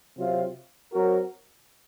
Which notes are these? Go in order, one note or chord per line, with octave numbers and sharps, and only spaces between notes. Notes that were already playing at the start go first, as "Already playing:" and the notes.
C3 F#3 C4 F4
F#3 C4 F#4 A#4